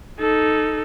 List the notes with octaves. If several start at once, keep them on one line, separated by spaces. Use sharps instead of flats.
D#4 A4